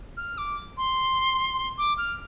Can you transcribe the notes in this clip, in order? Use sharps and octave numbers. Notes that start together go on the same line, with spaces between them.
F6
D6
C6
D6
F6